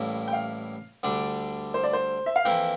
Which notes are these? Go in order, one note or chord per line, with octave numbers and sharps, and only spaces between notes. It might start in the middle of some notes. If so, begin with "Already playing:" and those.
Already playing: A1 A2 G3 A#3 E4
G5
F5
D2 D3 G3 D4
C5
D5
C5
E5
F5
F2 E3 A#3 E4 G5